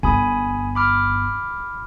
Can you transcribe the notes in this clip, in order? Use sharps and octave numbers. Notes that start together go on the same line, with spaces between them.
G1 G#5 B5 D#6
B5 D6 F6